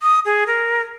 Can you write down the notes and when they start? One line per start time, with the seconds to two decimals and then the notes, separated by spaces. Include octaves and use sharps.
0.01 D#6
0.25 G#4
0.47 A#4